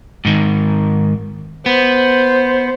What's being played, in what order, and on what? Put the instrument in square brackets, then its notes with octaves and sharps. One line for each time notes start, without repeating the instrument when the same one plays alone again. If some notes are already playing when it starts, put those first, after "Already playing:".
[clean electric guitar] G#2 D#3
[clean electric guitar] B3 [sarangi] C5